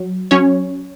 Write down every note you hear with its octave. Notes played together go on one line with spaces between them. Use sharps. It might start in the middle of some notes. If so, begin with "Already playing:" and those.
Already playing: F#3
F#3 C#4 C#5